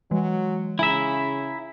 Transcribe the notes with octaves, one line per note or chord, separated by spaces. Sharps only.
E3 F#3 G#3
C#3 E4 E5 G#5 A#5